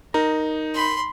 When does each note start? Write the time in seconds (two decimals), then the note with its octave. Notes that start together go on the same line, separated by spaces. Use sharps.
0.14 D#4 A#4
0.74 B5 C6